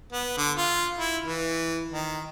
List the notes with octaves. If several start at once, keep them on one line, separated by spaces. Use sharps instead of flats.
B3
D3
F4
E4
E3
D#3